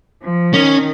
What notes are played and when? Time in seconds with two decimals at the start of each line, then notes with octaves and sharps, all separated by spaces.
0.23 F3
0.53 D#3 C#4